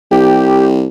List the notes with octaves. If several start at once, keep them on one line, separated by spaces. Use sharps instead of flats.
C2 G4